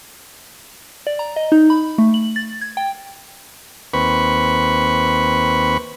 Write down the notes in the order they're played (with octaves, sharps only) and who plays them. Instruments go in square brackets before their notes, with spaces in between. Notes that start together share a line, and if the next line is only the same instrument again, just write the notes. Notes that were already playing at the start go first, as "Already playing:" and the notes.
[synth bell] D5
A#5
D#5
D#4
B5
A3
F#7
A6
G#6
G5
[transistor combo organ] D#2 C4 B4 B5 C#6